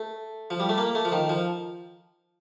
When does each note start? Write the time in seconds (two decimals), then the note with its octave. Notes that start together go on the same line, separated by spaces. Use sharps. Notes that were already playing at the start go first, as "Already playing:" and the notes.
Already playing: A3
0.50 F3
0.60 G3
0.69 A3
0.78 A#3
0.95 A3
1.05 F3
1.12 D#3
1.29 F3